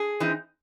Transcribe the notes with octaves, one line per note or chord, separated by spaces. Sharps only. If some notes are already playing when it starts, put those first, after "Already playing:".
Already playing: G#4
E3 C4 D#4